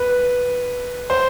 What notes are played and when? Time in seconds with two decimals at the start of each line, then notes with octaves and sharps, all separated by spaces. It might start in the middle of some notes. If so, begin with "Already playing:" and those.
Already playing: B4
1.10 C5